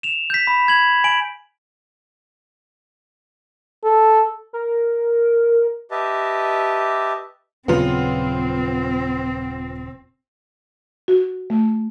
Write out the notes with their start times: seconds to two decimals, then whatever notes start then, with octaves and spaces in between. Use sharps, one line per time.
0.03 E7 F7
0.30 G6 B6
0.47 B5
0.68 G#6 F#7
1.04 G#5 D7 F#7
3.84 A4
4.53 A#4
5.91 G4 B4 D#5 E5 A5
7.68 D#1 C#3 F#3 B3 C4 F4
11.08 F#4
11.50 A3